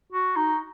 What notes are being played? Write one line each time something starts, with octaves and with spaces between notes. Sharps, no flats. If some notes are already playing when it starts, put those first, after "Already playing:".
F#4
D#4